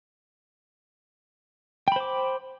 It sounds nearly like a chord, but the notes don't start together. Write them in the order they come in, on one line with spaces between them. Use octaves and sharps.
G5 B5 C5 D6